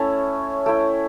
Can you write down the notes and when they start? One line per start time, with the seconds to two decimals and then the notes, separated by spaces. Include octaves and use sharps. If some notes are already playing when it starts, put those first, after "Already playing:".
Already playing: A3 C#4 E4 A5
0.66 A3 E4 G5